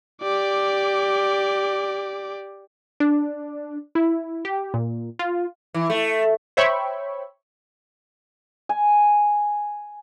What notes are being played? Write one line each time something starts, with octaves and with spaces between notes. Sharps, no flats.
G4 D5
D4
E4
G4
A#2
F4
E3
A3
C5 C#5 E5 G5 B5 C#6
G#5